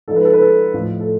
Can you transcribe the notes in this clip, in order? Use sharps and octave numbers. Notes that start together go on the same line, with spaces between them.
G#2 F3 A4
B4
A4
B4
A4
A2 F3
A4